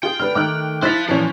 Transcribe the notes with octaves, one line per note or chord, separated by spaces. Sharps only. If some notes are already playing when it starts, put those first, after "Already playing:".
F4 G#4 G5
D3 B4 F6
D#3 A3 D6 F6 F#6
E4 C5 F5 F#6 A6 B6
A#2 E3 F3 C#4 A5 F7